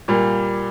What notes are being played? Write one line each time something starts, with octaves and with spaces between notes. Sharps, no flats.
A#2 G3 A#3